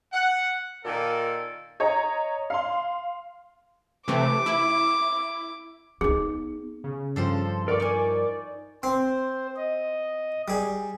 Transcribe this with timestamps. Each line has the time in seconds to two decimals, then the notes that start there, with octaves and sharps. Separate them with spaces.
0.13 F#5
0.84 A#2 D#3 A#3 A4
1.80 C#5 D#5 A#5
2.50 F5 C6
4.08 C3 E3 A3 D6
4.46 E4
6.01 B3 D#4 G#4
6.84 C#3
7.16 G2 F3 A4 C5 C6
7.68 A#4 D5 C#6
7.80 D#4 G#5
8.83 C4 C5
9.56 D#5
10.48 G3 G#4